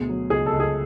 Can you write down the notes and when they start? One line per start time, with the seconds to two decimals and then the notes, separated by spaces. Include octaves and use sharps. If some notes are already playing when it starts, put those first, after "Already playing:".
Already playing: D2 B2 G#4
0.09 F#3
0.30 C#2 G#4
0.46 A4
0.53 C#2
0.60 G#4